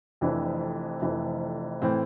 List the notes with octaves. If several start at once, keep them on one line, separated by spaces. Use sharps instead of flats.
F1 F2 E3 D4
F1 F2 E3
A2 E3 C4